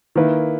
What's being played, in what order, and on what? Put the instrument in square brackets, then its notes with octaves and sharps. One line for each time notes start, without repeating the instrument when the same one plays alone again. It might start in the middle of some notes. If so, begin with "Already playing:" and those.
[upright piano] D#3 A#3 E4 B4